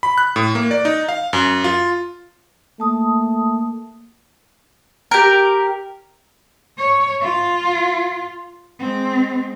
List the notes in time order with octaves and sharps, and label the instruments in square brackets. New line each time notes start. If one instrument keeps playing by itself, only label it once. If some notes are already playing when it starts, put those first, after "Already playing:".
[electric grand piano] B5
F#6
A2
A#3
D5
D#4
F5
F#2
F4
[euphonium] A3 [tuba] A#3 [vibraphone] A5 D#6
[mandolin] G4 A#4
[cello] C#5
F4
G#3 C4